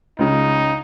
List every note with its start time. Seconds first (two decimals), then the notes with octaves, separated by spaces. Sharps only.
0.19 C#2 C#3 D#4